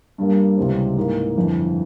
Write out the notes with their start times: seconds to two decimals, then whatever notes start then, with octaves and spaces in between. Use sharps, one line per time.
0.18 G2 G3 A#3
0.58 C#2 C3 E3 G3 C4
0.97 G#2 E3 A#3
1.36 G1 F2 E3